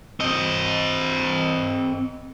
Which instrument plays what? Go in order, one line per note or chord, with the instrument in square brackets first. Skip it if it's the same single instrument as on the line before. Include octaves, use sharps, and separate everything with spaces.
[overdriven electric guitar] C4 D#5